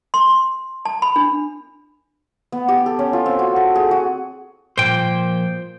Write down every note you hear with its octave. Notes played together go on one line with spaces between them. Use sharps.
C6
A5
B5
D4
B3
G4
A4
C#4
F4
C4
F#4
A4
G#4
F#4
A#2 F3 C5 G5